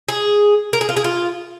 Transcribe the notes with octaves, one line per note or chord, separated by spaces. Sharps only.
G#4
A#4
G#4
F4
G#4
F4